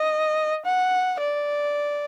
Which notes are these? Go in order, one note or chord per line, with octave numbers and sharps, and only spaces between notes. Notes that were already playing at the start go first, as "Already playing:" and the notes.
Already playing: D#5
F#5
D5